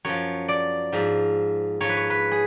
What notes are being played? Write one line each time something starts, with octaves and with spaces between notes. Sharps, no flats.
F#2 F3 C#5
D5
G#2 F3
G#2 F3 C#5
B4
C#5
B4
G#4